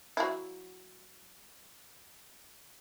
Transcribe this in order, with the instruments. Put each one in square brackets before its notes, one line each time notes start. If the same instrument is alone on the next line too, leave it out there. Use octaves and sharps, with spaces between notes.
[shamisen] F#3 E4